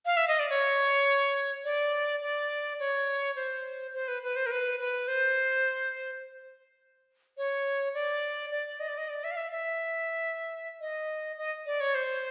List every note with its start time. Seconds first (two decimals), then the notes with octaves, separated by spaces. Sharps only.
0.06 F5
0.17 E5
0.28 D#5
0.39 D5
0.50 C#5
1.64 D5
2.22 D5
2.80 C#5
3.36 C5
3.94 C5
4.08 B4
4.23 B4
4.36 C5
4.46 A#4
4.51 B4
4.80 B4
5.08 C5
7.37 C#5
7.94 D5
8.52 D5
8.80 D#5
8.88 D5
8.98 D#5
9.09 D5
9.24 E5
9.31 F5
9.37 E5
9.52 E5
10.81 D#5
11.38 D#5
11.66 D5
11.80 C#5
11.95 C5